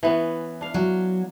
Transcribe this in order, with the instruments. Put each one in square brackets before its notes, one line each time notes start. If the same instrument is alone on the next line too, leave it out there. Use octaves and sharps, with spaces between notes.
[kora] E3 B3 C#4
D4 F5
[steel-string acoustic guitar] F#3